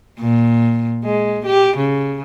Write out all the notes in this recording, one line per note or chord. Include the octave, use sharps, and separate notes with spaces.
A#2
G#3
G4
C#3